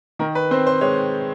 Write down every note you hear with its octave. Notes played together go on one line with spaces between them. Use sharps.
D#3 A#4
B4
C4 C5
C5
G#3 C#5